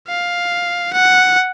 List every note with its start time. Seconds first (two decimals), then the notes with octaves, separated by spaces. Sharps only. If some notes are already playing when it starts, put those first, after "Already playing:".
0.08 F5
0.93 F#5